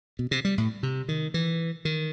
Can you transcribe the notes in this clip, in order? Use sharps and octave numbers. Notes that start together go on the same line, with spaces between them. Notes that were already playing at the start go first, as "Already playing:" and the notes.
B2
C3
G3
A2
C3
D#3
E3
D#3